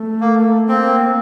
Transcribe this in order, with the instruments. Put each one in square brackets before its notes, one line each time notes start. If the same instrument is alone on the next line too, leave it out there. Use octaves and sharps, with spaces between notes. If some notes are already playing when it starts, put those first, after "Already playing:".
Already playing: [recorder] A3
[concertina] A#3
[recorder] A#3 [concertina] C4